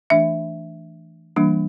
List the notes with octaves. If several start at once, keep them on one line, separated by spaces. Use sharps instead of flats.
E3 A3 D4 E5
E3 G3 A#3 D4